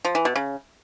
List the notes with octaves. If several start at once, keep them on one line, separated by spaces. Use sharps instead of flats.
F3
E3
B2
C#3